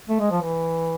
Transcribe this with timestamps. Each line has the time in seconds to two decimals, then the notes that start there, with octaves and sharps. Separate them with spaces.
0.09 A3
0.20 G#3
0.31 F3
0.41 E3